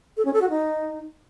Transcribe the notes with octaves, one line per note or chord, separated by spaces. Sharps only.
A4
C#4
A4
F#4
D#4